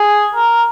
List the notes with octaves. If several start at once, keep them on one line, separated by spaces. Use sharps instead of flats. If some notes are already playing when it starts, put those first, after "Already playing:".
Already playing: G#4
A#4